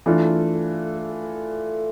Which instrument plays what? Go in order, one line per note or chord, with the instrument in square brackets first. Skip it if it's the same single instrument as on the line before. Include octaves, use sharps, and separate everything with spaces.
[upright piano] E3 A3 D4 F4